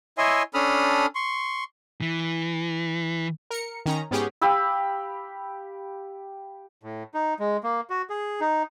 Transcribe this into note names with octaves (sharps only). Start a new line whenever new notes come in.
E4 C#5 D#5 E5 G#5 C6
C#4 D4 A4 B5 D#6 F6
C6 C#6
E3
A#4 C#7
D#3 C#4 A#5
G#2 B3 C#4 G4 G#4
G4 F5 B5 E6
A2
D#4
G#3
A#3
F#4
G#4
D#4